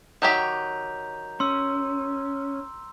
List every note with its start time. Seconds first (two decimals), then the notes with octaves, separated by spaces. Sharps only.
0.22 D#3 F#3 G4 A#5 G6 F7
1.40 C#4 C6 E6